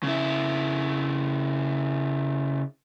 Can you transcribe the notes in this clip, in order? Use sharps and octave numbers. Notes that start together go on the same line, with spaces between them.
C#3 E4